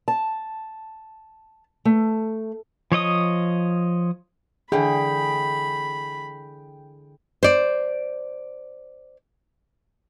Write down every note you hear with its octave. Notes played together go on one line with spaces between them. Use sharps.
A5
A3
F3 C#5 D#5 D#6
D3 E3 G#4 G5 B5
C5 D5